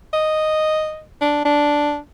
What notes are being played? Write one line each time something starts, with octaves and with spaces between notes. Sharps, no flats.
D#5
D4
D4